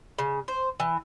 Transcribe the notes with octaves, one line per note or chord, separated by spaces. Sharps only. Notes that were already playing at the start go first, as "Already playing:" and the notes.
C#3
C5
E3